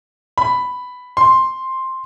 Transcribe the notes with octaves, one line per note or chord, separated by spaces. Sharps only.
B5
C6